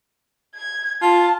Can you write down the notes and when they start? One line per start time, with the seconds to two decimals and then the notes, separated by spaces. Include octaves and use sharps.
0.55 G#6
1.02 F4 A5